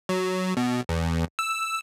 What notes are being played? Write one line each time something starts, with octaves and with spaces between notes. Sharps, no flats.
F#3
B2
E2
E6